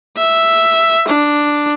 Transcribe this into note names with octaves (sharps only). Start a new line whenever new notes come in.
E5
D4